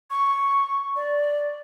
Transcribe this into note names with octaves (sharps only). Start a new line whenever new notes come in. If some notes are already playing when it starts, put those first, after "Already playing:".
C#6
D5